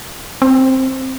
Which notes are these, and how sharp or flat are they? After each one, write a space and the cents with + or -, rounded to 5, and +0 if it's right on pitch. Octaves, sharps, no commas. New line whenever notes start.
C4 +5